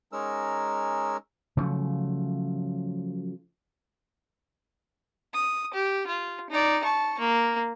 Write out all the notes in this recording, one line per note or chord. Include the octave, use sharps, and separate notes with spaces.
G#3 C#4 D#4 A#4 E6
C#3 F3 F#3 A3
D#6
G4
F4
D#4 D5
A5 C#6
A#3